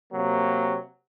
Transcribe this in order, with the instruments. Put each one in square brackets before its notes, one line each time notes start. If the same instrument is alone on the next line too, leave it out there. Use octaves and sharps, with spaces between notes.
[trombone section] C3 F#3 A#3